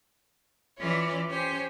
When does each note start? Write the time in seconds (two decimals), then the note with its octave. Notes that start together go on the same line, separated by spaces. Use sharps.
0.79 E3 C#4 F4 C#5 D5
1.29 C#4 G4 C5 C#5 G#5